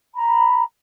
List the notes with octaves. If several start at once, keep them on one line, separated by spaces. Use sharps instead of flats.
A#5 B5